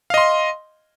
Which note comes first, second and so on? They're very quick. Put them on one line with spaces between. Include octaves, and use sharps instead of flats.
F5 D#5 C6